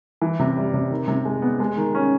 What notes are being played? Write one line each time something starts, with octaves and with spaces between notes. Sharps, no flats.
E3
C3
G3
C3
D#3
C3
G#3
B3
G#3
D#3
C#4